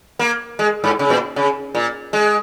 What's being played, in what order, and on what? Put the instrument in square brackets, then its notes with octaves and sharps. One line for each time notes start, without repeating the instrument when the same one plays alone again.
[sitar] A#3
G#3
G#2
C#3
A#2
C#3
A#2
G#3